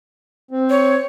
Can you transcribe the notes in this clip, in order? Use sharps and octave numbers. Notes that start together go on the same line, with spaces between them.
C4
C#5